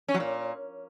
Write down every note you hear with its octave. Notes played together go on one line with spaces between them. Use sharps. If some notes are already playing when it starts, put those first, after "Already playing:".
C#4
F#3
A#2